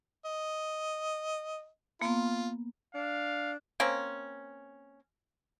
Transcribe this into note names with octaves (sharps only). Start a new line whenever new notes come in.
D#5
A#3 B3 F4
D4 F5
A#3 C4 C#4